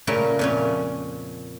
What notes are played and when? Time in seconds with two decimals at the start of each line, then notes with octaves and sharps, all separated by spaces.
0.07 A#2 C#3 A3 E4 A#4
0.39 F2 A#2 C#4